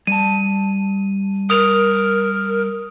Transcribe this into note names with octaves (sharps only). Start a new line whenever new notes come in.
G3 A5 D#7
A#4 D#6 F7